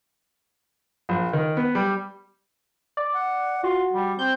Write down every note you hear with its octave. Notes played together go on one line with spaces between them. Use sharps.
A#1
D#3
B3
G3
D5
F#5
F4 F#4
G3
C4 G6